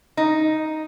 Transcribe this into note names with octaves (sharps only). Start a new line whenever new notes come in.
D#4